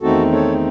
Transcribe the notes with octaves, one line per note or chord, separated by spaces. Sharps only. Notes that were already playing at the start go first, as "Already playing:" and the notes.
E2 D#3 A3 C4 D#4 F#4 A4
A4 C#5